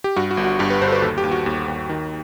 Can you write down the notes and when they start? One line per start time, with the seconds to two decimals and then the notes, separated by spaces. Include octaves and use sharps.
0.04 G4
0.16 G2 F#4
0.31 F#4
0.37 G1
0.44 F#4
0.59 G2 G4
0.70 B4
0.81 G1 C5
0.87 A4
0.92 B4
1.02 D#2 A4
1.18 G4
1.24 D#2
1.31 F#4
1.46 D#2
1.68 D#2
1.89 D#3